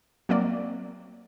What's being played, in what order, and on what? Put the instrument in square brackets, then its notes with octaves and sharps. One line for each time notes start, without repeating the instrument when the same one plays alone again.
[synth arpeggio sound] F#3 A#3 C4 D5